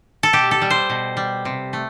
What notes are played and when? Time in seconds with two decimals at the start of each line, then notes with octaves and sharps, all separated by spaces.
0.23 A4
0.33 B2 G4
0.51 A4
0.62 G3
0.70 C5
0.90 B2
1.17 G3
1.45 C3
1.73 A3